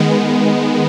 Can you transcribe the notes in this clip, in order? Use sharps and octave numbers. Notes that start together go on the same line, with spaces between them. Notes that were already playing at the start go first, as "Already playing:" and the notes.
Already playing: D#3 G#3 B3